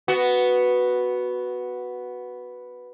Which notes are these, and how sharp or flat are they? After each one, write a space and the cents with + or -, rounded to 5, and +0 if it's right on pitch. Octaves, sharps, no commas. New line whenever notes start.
B3 +0 F#4 +0